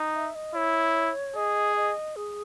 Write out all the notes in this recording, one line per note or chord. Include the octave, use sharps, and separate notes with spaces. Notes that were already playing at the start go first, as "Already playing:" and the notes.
Already playing: D#4
E5
D#5
E4 C#5
G#4 D#5
D#5
G#4